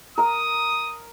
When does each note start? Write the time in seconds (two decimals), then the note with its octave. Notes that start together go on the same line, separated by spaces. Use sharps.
0.18 A#4 A#5 D#6